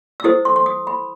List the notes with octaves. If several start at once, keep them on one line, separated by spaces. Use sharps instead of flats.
E6
E4 A4 C5 D#6
C6
C6
D#6
B5